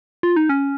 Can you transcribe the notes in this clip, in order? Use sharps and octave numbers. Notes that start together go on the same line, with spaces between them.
F4
D#4
C#4